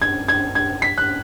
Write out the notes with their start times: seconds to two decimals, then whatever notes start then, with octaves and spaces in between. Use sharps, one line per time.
0.02 G#6
0.28 G#6
0.55 G#6
0.82 B6
0.98 F#6